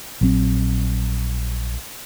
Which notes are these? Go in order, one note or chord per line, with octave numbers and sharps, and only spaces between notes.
A#1 F#3 C4